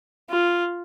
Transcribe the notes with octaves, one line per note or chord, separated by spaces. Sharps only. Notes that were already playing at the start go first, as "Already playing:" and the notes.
F4